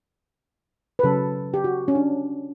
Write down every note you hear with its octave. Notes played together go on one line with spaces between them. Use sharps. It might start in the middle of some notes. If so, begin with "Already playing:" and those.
B4
C#3 F#3 C#4 A4
G4
F#4
C#4
D4